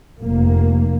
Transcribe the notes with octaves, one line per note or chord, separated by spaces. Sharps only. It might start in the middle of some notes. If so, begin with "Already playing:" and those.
F1 A#3